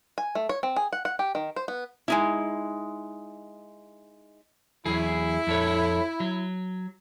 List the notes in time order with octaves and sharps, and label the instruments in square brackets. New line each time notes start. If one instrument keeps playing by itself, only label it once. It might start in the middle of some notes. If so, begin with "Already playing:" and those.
[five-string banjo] G#5
A3
C#5
C4
G#4
F#5
F#5
G4
D#3
C5
B3
[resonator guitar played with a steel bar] G#3 D#4 E4
[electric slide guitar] E2 F#3 G#4 [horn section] E4
[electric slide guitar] F2 A4 C#5
F#3